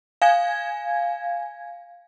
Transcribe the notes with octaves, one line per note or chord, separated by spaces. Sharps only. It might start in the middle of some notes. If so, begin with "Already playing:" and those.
F5 G#5 G#6